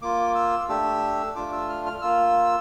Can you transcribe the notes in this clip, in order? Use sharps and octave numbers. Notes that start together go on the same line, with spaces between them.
A#3 F4 D6
E6
A3 D4 G4 E6
A3 D4 F4 D6
E6
F6
F6
A#3 F4 E6